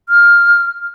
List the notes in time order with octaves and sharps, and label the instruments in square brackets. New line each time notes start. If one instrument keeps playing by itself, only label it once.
[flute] F6